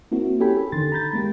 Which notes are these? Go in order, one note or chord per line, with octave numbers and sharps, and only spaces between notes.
A#3 C4 E4 F#4
C#4 G4 A4 G5 G#5 B5
A4
D3 D#3 C6 A6
A#5 B5 G6 A6
G#3 A#3 G4